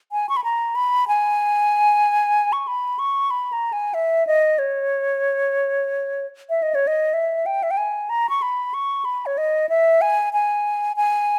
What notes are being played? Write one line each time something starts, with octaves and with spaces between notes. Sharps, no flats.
G#5
C#6
B5
A#5
B5
G#5
C#6
B5
C#6
B5
A#5
G#5
E5
D#5
C#5
E5
D#5
C#5
D#5
E5
G5
E5
G5
G#5
A#5
C#6
B5
C#6
B5
C#5
D#5
E5
G#5
G#5
G#5